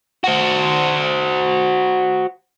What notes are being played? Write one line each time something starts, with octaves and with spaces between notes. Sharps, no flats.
F#4 C5